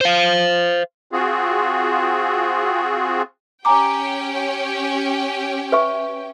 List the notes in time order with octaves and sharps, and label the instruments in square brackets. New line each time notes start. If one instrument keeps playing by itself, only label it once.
[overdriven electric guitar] C5 F5
[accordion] C4 F4 F#4 G#4
[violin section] C#4 G4 G5 [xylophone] G#5 A#5 D6
[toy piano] B4 E5 C#6